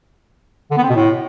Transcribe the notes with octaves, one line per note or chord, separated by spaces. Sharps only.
D3
B3
C4
B2
A2